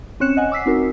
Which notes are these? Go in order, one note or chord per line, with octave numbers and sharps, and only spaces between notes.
C4 C#4 C#5 F#6 C#7 E7
D#5 F#5 G#5
D6 E6 B6 C7
C4 D#4 F#4 A#4